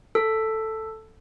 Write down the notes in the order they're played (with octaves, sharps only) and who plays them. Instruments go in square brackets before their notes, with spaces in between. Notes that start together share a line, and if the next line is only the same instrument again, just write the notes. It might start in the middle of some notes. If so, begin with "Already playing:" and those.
[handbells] A4